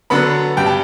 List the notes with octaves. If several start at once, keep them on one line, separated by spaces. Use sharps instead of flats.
D3 F#3 B3 B5
G2 G5
A5